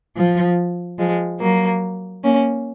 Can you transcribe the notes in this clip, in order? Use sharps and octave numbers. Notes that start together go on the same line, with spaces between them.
F3
F3 G#3
F#3 A#3
A#3 C#4